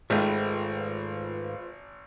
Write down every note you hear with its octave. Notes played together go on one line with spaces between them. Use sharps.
G#1 G#2 D#3 G#3 A3 F4 B4 C5